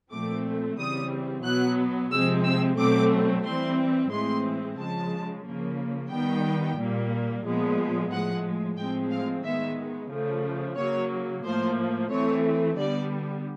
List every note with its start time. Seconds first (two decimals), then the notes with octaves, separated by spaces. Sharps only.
0.11 A#2 F3 A3 C4 D6
0.78 C#3 E3 G3 C4 D#6
1.44 B2 F#3 B3 F#6
2.11 C3 F3 G#3 C4 E6
2.44 E6
2.78 B2 F#3 A3 C4 D6
3.44 E3 G3 C4 C6
4.10 A2 E3 G#3 C4 C6
4.78 C#3 F3 G#3 A5
5.44 C#3 F3 A#3
6.11 D#3 G3 B3 G5
6.78 A#2 G3 A#3
7.44 A#2 F3 G#3 B3
8.11 A2 F3 G#3 F#5
8.77 A2 F3 G#3 C4 G5
9.11 F5
9.44 D#3 G#3 B3 E5
10.11 C#3 F3 A3
10.77 C#3 F#3 A#3 C#5
11.44 A2 F3 A#3 C5
12.10 E3 A3 C4 C#5
12.77 D3 G3 B3 D5